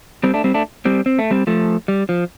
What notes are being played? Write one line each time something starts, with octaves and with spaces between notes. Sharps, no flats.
G3 C4
A3 D4
G3 C4
A3 D4
G3 C4
C4
A3
G3 C4
F3 A3
G3
F3